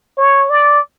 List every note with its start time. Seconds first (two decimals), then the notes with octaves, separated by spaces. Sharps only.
0.18 C#5
0.50 D5